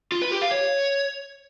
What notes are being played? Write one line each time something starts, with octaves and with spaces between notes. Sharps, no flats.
F4
B4
G4
F5
C#5